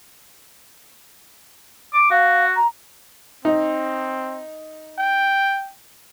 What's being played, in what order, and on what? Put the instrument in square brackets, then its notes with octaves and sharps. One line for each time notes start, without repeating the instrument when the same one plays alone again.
[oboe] D6
[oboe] F#4 [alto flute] F5
[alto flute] A#5
[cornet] C4 [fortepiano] D#4
[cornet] G5